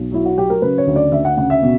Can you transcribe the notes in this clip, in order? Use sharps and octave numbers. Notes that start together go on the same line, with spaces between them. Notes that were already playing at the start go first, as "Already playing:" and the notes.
Already playing: B1
F#3 E4
F#4
F#3 G4
A#4
C#3 B4
C#5
D2
D5
D2 E5
F#5
C#3 F#5
E5
B2